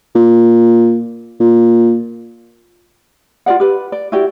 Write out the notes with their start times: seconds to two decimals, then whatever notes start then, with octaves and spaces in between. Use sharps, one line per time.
0.15 A#2
1.40 A#2
3.46 F4 G#4 D5 F#5
3.60 G4 B4
3.92 D5
4.12 E4 F#4 G4 D5